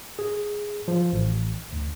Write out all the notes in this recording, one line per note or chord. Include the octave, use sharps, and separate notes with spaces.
G#4
F3
A1
D2